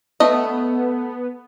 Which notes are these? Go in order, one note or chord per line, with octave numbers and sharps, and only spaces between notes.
A3 B3 D#5